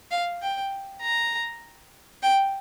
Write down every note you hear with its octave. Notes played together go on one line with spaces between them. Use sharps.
F5
G5
A#5
G5